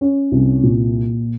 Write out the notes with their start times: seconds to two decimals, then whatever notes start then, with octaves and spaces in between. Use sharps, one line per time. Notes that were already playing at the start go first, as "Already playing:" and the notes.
0.01 C#4
0.32 C2
0.63 A#2